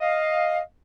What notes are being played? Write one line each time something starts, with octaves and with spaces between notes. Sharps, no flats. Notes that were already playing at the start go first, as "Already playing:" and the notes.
D#5 F5